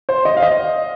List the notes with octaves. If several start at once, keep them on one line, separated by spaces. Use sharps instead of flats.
C5
D#5
F5
D#5